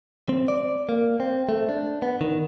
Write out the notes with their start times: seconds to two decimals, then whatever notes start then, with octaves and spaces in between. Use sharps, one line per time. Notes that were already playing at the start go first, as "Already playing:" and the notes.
0.29 C4
0.48 D5
0.89 A#3
1.20 C4
1.49 A3
1.69 D4
2.02 B3
2.21 D#3